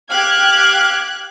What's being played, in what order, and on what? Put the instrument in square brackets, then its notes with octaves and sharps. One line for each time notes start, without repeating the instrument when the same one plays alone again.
[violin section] G4 D6 G#6 [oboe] F5 [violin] F#6